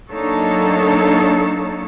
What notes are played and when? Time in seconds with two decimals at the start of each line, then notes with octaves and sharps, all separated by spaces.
0.11 F#3 A#3 D4 D#4 A4 C#5